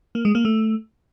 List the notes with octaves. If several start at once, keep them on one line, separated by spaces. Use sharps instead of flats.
A#3
G#3
A#3
A3